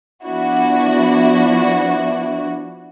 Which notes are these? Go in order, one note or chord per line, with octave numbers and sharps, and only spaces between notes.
F3 B3 D4 E4 F#4